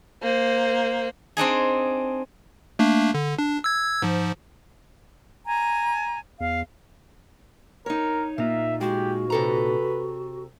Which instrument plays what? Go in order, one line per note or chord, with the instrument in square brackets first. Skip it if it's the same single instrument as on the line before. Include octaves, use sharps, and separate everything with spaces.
[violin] A#3 C5
[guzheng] C4 D4 D#4 G#4
[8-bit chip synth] A3 A#3 D4
D3
D4
E6 G#6
G#2 F3
[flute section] G#5 A#5
[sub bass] E2 [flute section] F5
[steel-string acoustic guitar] D#4 C#5 [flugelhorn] A#4
[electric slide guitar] A#2 D#4 F4 [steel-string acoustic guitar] A#3 [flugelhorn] E5
[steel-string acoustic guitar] G#3 [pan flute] F#4 [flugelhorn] G4
[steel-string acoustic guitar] C3 A4 A#5 [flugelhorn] B4